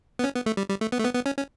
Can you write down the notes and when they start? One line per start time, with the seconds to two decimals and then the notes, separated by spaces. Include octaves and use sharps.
0.19 B3
0.24 C#4
0.35 B3
0.46 A3
0.57 G3
0.69 G3
0.81 A3
0.92 B3
0.99 A3
1.04 B3
1.15 B3
1.26 C#4
1.37 C#4